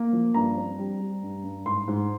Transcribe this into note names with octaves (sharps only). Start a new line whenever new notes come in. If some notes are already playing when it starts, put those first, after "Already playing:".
Already playing: A#3
F3
G2 A#5
C4
G3
G3
G2
G2
G#2 C6
G#2